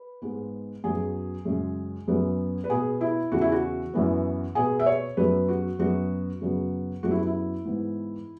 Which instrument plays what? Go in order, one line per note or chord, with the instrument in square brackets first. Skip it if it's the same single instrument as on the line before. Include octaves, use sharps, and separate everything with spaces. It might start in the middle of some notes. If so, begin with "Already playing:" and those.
Already playing: [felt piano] B4
G#2 G#3 B3
F#2 F#3 B3 G#4
F#2 C#3 G#3
F#2 F#3 B3
B4
B2 B3 G#4
E4
E2 C#3 E3 F#4
E4
F#4
F#2 E3 B3
B2 B3 G#4
E5
C#5
F#2 F#3 B3 B4
F#4
F#2 F#3 B3 F#4
F#2 C#3 F#3 B3
F#2 F#3 B3 F#4
E4
E4
G#2 E3 B3